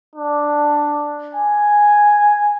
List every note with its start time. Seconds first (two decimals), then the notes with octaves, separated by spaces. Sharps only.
0.16 D4
1.35 G#5